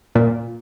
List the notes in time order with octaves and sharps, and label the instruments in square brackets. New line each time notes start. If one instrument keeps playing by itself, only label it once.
[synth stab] A#2